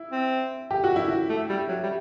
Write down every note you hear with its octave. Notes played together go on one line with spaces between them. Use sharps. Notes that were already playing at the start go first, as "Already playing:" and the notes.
Already playing: E4
C4
G4
F#4
E4
F#4
A3
G3
F#3
G3